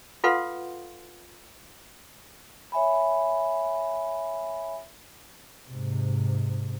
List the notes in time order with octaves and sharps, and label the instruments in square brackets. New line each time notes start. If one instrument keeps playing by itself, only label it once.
[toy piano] F4 A4 B4 F5 F#5 C6
[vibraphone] C#5 E5 G#5 B5
[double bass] G#2 C3